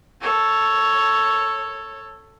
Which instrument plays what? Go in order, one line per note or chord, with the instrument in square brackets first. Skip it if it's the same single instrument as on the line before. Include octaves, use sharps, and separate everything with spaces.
[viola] A4 C#5